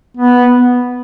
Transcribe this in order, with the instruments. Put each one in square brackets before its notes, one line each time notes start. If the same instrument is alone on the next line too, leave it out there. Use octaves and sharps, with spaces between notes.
[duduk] B3